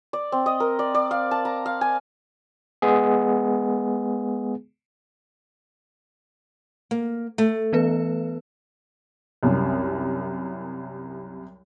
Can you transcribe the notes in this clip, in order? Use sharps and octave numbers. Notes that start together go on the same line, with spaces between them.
D5
C4
D#5
A#4
D5
D5
F5
A5
A#5
F5
G#5
G#3 B3 G#4
A#3
A3
E3 B3 B4
C2 F#2 C3